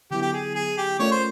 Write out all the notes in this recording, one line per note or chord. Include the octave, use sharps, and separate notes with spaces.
D3 F#3 B3 E4 G4
G4
G#4
G#4
G4
A3 C#4 F4 A#4 C#5 D5
C5